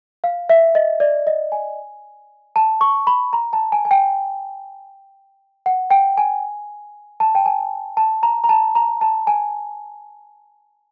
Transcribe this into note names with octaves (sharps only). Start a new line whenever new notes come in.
F5
E5
D#5
D5
D#5
G#5
A5
C#6
B5
A#5
A5
G#5
G#5
G5
F#5
G5
G#5
A5
G5
G#5
A5
A#5
A#5
A5
A#5
A5
G#5